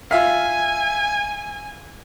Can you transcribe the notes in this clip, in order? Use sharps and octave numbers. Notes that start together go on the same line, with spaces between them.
F4 E5 F5 G#5